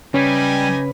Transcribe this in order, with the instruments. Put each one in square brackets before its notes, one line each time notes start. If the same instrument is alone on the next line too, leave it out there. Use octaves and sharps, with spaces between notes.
[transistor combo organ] C#3 B4 [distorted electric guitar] G3 [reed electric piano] C#4 [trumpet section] D#4 G4 G#5